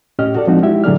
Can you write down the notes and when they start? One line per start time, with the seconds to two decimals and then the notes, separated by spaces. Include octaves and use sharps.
0.19 A2 C#4 G4 D#5 F6
0.35 F#4 A4 D5
0.47 F3 G#3 C4 D4 D#4 F#4
0.62 G#3 E4 G4 E5
0.84 A2 D3 F#3 G#4 D5 F6